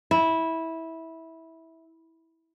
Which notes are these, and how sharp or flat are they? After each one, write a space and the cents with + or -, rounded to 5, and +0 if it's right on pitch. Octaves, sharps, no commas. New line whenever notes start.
E4 -15